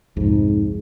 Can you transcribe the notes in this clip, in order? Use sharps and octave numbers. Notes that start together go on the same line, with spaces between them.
C2 F2 G#2